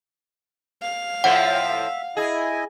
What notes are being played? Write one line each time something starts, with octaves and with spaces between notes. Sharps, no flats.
F5
A2 F3 C4 E5 F#5
E4 G#4 D#5 G#5